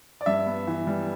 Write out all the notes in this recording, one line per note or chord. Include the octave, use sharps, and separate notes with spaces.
D5
G2 E5
B3
E3
G3